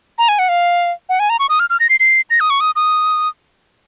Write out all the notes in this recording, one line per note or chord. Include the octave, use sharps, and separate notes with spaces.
A#5
G#5
F#5
F5
F#5
G#5
A#5
C#6
D#6
F6
F6
A#6
C7
C7
A#6
D#6
C#6
D#6
D#6